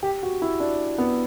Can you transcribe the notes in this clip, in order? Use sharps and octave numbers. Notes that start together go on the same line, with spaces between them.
G4
F#4
E4
D4
B3